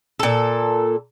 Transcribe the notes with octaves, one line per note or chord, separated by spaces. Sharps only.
A#2 A4